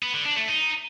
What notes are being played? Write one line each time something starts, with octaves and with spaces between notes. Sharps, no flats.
B3
D3
D4
A3
D#4